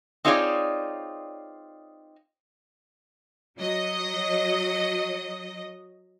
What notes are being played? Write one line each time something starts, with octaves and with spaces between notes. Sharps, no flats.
C4 D#4 F4 G#4 C#5 D5
F#3 D#5